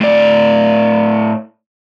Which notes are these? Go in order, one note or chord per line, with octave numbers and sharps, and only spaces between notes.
A2 D5